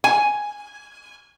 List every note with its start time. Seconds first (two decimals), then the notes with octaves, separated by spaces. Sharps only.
0.04 G#5